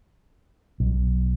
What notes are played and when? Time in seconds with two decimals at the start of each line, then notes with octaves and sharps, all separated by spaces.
0.80 B1